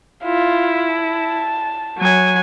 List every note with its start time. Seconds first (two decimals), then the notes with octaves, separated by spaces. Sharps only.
0.24 E4 F4
0.94 A5
1.98 F#3 G#5